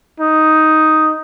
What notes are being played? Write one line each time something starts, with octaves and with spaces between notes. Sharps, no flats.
D#4